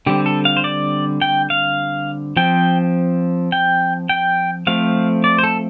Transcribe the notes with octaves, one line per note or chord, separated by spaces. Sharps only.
D3 G3 C4 G4
A4
F5
C5
D5
G5
F5
F3 C4 G5
G5
G5
F3 A3 C4 F5
D5
C5
A4